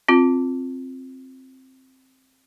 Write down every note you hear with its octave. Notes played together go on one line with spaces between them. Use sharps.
C4 F4